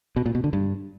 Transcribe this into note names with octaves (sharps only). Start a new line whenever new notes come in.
B2
A#2
B2
D3
G2